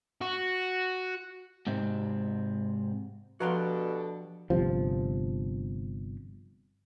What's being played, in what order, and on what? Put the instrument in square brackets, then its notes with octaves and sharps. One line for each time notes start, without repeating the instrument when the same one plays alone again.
[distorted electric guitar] F#4
[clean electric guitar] G#2 C3 C4
[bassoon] B2 [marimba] F3 [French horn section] D4 G4 A4 [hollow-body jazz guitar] F#4 A#5 C6
[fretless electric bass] G1 C3 F3